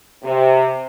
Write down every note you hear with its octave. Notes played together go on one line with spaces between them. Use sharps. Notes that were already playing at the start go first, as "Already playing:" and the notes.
C3